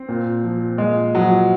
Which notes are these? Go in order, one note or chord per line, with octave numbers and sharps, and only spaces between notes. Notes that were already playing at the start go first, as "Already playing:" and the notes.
Already playing: C4
A#2
F3
A#2 G#3
F3 F#3